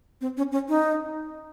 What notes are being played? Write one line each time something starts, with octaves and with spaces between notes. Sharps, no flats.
C4
C#4
C#4
D#4